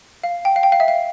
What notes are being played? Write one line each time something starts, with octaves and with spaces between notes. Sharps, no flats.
F5
G5
F5
G5
F5
E5
F5